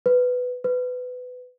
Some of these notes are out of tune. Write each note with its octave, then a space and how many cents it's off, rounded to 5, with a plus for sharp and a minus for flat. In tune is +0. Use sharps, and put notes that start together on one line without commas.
B4 +10
B4 +20